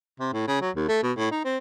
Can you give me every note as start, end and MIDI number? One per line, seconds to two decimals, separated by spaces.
0.20 0.31 48
0.33 0.45 45
0.48 0.58 49
0.61 0.70 54
0.76 0.87 39
0.88 0.99 57
1.03 1.12 47
1.18 1.31 45
1.31 1.43 63
1.44 1.58 60